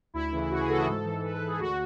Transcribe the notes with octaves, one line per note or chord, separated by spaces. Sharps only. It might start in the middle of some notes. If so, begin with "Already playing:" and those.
D2 E4
C#3 E3
D2 F#4
G#4
C#3 E3 F#4 A4
G#2 A4
E3
G#2 B4
B4
E3
G#4
D2 F#4